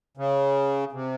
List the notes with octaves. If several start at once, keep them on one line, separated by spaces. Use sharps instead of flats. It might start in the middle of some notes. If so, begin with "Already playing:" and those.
C#3
C3